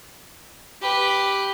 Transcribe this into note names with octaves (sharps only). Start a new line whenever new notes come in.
G4 B4